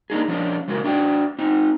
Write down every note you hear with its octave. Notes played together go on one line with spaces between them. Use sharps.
A#3 D4 D#4 G#4
F3 C#4 D4
F2 C#3 G#3 F#4 A#4
D4 F#4 D5 G5
C4 D#4